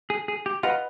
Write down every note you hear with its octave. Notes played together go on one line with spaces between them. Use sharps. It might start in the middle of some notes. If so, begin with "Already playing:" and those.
G#4
G#4
G4
F4 B4 D#5 F#5 B5